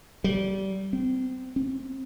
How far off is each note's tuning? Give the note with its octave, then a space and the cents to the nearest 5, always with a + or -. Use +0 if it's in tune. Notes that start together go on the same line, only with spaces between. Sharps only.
G3 -25
C4 -25
C4 +35